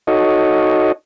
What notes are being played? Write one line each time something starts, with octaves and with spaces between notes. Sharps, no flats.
D#4 F#4 A4 C#5 D#5